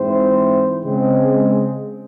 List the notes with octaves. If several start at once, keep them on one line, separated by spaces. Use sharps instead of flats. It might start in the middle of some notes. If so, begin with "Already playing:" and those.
Already playing: G#2 E3 C4 E4 C5
C#3 G#3 C4